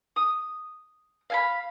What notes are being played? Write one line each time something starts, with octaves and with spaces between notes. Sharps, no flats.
D#6
F5 G#5 B5